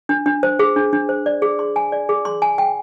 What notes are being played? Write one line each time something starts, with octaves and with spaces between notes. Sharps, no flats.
D4
D4
C5
G#4
D4
D4
C5
D5
G#4
C6
G#5
D5
G#4
C6
G#5
G5